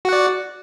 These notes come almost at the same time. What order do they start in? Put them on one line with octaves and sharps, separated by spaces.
F#4 F#5 D5